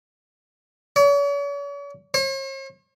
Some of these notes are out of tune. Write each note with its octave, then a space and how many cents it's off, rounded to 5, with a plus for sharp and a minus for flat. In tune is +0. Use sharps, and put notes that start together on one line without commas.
C#5 +45
C#5 -45